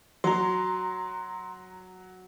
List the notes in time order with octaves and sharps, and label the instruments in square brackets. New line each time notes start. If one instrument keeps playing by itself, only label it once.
[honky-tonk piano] F#3 [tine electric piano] A#5 C6